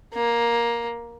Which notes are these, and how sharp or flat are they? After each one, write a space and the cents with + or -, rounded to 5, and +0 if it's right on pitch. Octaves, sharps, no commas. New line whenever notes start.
A#3 +10